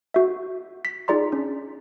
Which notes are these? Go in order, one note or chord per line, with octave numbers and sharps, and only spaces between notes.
F#4 E5
B6
D#4 F4 G#4 D5 A#5 C6
C#4 D4